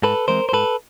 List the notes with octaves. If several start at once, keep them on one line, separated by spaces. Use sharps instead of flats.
G#2 A4 B4
E3 G#3 C4 A#4 C5
C5
G#2 A4 B4